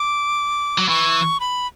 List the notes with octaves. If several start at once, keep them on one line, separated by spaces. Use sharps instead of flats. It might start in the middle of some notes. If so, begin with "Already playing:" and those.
Already playing: D6
F#3
E3 C#6
B5